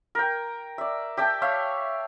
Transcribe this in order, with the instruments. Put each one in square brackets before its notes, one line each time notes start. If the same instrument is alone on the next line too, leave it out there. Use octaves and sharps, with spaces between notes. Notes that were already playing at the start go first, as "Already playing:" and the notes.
[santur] A#4 G5
D5 E5
G4 E5 G5 A5
C#5 E5 F5